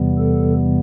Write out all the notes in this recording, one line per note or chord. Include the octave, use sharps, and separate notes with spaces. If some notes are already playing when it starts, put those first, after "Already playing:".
Already playing: E2 C3 E3 G3 B3
A4